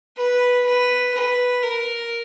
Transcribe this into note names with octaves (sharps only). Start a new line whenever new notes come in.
B4
B4
B4
A#4